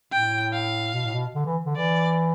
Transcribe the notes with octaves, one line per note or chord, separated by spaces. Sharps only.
A2 G5
F5
B2
A2
B2
D3
E3
D3
E3 D5